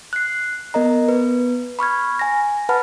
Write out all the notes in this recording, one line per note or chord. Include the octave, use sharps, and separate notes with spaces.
F#6 C7
B3 A#4 D#5 A#5
B3 B4
B5 C#6 F6 G#6
G#5 A#6
B4 F#5 A5 B5 F6